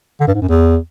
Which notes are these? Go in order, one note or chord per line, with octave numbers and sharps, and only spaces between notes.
D3
G2
G#2
F#2
E2